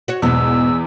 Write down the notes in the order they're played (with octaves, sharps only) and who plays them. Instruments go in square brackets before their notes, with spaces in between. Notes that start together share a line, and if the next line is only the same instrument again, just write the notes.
[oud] F#4 C#5
[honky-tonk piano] E2 [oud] G#2 B2 [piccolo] E6